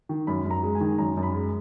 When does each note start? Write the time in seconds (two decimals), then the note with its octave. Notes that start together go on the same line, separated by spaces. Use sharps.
0.09 D#3
0.27 F#2 B5
0.45 F#2
0.51 A#5
0.63 G#3
0.75 G#5
0.81 D#3
0.98 F#2 A#5
1.17 F#2
1.23 B5
1.34 G#3